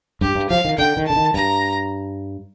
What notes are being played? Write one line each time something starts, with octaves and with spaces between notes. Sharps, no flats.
G2 G4
G2
F3 F5
D#3
D3 G5
D#3
D3 A5
D#3
G2 A#5